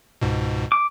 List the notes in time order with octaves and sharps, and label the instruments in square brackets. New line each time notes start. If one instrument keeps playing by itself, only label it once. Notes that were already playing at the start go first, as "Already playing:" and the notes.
[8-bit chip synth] C#2 G#2 B2
[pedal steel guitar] D6